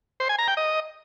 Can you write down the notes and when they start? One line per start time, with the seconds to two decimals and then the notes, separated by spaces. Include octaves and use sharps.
0.20 C5
0.29 G#5
0.38 A#5
0.48 G5
0.57 D#5